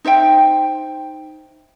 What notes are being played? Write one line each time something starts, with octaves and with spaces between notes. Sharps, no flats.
D#4 C5 E5 G5